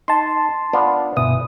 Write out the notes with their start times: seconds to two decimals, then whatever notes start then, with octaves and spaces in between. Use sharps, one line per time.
0.08 D#4 A5 C6
0.73 B3 D4 F4
1.16 G1 B2 E3 D#6